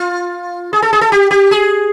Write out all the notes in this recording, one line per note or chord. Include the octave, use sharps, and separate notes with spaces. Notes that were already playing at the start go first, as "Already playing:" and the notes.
Already playing: F4
G#4
A4
G#4
A4
G4
G4
G#4